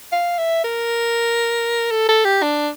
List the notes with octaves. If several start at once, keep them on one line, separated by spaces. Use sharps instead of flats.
F5
E5
A#4
A4
A4
G4
D4